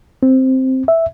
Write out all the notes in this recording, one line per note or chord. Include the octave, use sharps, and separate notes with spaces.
C4
E5